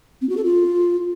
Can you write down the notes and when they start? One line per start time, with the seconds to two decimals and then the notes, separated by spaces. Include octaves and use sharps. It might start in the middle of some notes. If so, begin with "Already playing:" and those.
0.21 C4
0.29 F#4
0.36 A4
0.44 F4